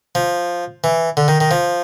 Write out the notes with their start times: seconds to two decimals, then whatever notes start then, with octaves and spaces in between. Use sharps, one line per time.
0.15 F3
0.84 E3
1.17 D3
1.28 D#3
1.40 D#3
1.51 F3